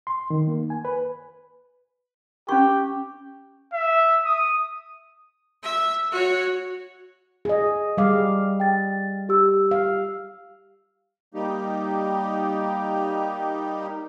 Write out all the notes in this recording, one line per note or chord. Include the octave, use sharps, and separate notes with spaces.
C6
D#3
A#3
G#5
B4
C#4 G4 C#6
E5
D#6
E5
F#4 C#5
G#4 D#5
G3 G#4 F5 D6
G5 A6
G4 E6
F5
G3 A#3 D#4 G4